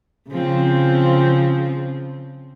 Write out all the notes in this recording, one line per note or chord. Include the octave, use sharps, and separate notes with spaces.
C#3 F3 C4